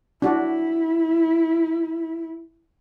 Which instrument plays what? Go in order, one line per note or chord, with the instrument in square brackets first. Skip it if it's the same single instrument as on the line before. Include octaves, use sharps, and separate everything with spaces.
[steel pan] D4 F#4 [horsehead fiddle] E4